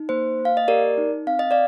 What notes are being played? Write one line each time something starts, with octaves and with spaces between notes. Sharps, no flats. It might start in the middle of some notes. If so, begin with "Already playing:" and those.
Already playing: D#4
A#3 C5
A#3
F5
D#5
G4 A#4 D5
D#4
C4 F5
D#5
D5 F5